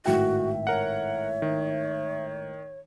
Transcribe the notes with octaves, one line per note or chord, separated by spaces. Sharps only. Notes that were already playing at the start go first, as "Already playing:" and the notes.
G#1 A2 F#4 E5 G5
A#4 C#5 F#5
D#3